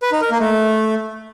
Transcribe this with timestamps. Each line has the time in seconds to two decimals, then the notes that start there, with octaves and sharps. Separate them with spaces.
0.03 B4
0.12 D#4
0.21 A#4
0.31 A#3
0.40 A3